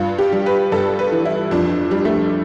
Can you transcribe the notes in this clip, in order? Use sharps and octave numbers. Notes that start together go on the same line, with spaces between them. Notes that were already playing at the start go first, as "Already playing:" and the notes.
Already playing: G2 F4
G4
G3
B4
G2 A4
B4
E3
E4
F2 D4
G3
A3